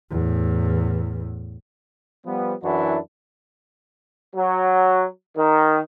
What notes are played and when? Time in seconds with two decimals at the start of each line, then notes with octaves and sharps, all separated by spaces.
0.11 E2 A2
2.25 F3 G3 B3
2.63 F#2 E3 D4 E4 F#4
4.35 F#3
5.37 D#3